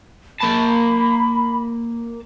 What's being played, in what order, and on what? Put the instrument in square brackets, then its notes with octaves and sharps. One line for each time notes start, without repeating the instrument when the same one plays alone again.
[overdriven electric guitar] A#3 A5 [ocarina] B5